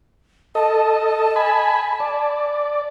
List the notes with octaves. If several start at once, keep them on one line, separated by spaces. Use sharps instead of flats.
A4 D#5 A5
G#5 B5
D5